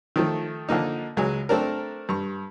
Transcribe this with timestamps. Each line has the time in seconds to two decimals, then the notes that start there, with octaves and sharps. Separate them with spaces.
0.16 D#3 F3 A3
0.69 D3 F3 A#3 D#4
1.17 C#2 F#3 G#3 G#5
1.49 A3 C4 D4 A#4
2.09 G2 C#6